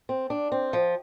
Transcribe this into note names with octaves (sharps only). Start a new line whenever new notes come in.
C4
D4
C4
F3